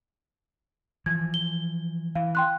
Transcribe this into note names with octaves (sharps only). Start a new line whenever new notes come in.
E3 F3 G#6
G7
E3 F5
G5 C6 F#6